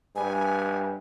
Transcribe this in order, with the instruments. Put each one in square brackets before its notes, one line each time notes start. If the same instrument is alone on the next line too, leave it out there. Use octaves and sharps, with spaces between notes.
[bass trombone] G2 [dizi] G#5